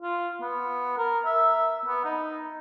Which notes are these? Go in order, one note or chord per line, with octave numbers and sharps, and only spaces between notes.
F4
B3
A#4
E5
B3
D#4